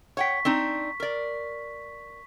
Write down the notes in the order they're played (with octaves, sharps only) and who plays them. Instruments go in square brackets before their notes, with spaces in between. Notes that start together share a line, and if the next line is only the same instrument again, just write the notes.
[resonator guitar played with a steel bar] C#5 F#5 G5 [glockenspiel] C#6 B6
[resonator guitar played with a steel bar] C4 D4 D#4
A#4 D5